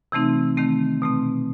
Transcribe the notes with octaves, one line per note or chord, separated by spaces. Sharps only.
C3 E3 A3 C4 D#4
D#3 A3 C4
B2 A3 C4